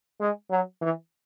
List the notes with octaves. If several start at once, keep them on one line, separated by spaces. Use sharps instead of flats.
G#3
F#3
E3